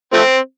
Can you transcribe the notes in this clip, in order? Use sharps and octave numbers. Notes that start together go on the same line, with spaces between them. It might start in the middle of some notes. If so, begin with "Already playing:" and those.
F3 A3 C4